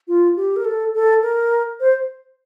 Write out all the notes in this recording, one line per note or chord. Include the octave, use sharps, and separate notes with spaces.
F4
G4
A#4
A4
A4
A#4
C5